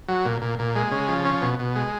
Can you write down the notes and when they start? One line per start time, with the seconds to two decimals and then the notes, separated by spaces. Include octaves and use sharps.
0.08 F#3
0.25 A#2
0.42 A#2
0.59 A#2
0.75 G#3
0.91 C#3
1.08 F3
1.25 C#4
1.42 B2
1.59 B2
1.76 G#3